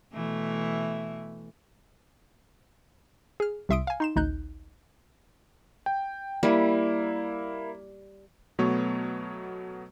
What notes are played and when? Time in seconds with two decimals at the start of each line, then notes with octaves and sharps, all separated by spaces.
0.13 B2 E3 A3
3.40 G#4 F6
3.69 C2 C3 E5 C6 D#6 D7
3.87 F5 G#5
4.00 D#4 C6 E7
4.16 A1 D2 D#4 F#6 G6
5.86 G5
6.43 G3 A#3 E4
8.59 B2 F#3 A3 B3 C#5